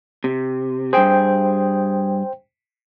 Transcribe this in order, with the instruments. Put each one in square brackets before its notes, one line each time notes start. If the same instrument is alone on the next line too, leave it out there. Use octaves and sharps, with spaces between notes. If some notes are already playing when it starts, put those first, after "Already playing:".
[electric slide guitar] C3
[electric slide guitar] G2 G#4 [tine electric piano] C5 G5